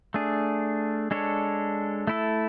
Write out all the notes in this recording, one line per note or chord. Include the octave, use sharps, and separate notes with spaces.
A3 D4 G#4
G#3 D4 A4 C#5
A3 E4 A4